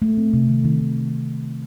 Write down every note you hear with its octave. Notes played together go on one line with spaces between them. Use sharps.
A3
C4
C3
D#3
D#3
D#3